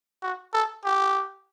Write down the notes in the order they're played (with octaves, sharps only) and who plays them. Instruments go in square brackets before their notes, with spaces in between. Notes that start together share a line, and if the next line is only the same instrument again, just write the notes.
[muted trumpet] F#4
A4
G4